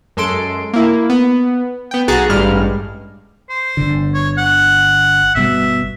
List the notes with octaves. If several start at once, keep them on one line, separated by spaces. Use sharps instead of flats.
F#2 G#3 A4 C6 D7
A#3 E4
B3
B3 G5
B1 F#4 G#4 A#5 F#6 A6
A1 G2 G3 G#3 F6
C5
G1 D3
C#5
F#5
G1 B2 G3 E5